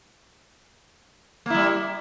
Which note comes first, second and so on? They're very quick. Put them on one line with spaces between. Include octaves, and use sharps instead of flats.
A#3 E4 G3